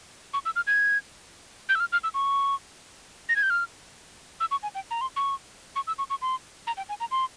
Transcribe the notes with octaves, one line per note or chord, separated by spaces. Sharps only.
C#6
E6
F6
G#6
G6
E6
F6
F6
E6
C#6
A#6
G#6
G6
F6
E6
C#6
G#5
G5
A#5
C6
C#6
C#6
E6
C#6
C#6
C6
A#5
G5
G#5
A#5
C6